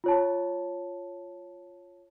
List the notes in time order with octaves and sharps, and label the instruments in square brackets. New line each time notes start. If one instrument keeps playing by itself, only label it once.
[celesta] F4 C#5 A5